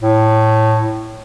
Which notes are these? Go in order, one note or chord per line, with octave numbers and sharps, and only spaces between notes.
A2